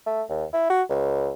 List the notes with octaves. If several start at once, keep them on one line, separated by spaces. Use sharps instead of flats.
A3
D#2
E4
F#4
C#2